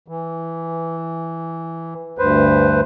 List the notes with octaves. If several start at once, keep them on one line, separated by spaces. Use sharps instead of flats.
E3
D2 G2 B4 C5